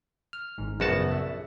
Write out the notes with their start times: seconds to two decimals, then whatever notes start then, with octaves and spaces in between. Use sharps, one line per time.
0.33 F6
0.58 G#1 G#2
0.80 A#1 F#2 C#3 B3 F#4 A5
1.12 E5